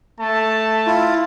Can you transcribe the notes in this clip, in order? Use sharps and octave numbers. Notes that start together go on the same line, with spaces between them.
A3 A5
E4 F4